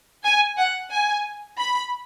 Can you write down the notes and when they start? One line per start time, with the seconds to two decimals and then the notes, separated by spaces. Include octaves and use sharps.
0.24 G#5
0.58 F#5
0.91 G#5
1.58 B5